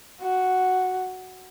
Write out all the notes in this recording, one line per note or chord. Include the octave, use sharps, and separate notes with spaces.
F#4